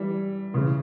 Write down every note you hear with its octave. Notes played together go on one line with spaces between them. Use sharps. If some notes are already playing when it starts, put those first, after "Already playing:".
Already playing: E3 G3
C#3 E3